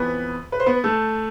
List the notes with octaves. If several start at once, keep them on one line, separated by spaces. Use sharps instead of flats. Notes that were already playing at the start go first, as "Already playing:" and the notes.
Already playing: F2 E3 B3 B4
B4
C5
B3 B4
A3 A4